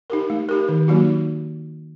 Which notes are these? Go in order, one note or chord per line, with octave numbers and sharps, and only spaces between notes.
D#4 G4 A#4
A3
D#4 G4 A#4
D#3
F#3 A#3 D#4 F#4